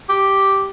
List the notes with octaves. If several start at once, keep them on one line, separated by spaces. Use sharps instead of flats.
G4